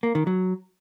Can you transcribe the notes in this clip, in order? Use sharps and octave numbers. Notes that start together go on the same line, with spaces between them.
A#3
D#3
F#3